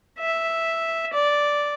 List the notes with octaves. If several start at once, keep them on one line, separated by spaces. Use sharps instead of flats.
E5
D5